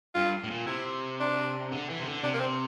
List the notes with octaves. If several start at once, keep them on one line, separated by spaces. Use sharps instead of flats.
G2 F4
A2
A#2
C3 E4
D4
D3
E3
C3
D3
C3 D4
A#3
C4